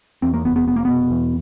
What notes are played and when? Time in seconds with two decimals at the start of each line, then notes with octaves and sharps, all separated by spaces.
0.22 E2 C4
0.34 A#3
0.45 F1 B3
0.56 B3
0.67 F1 B3
0.76 A#3
0.85 B2 B3
1.11 E2